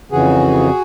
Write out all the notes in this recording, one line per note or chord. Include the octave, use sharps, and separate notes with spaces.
F2 C#3 E3 F#4 G#4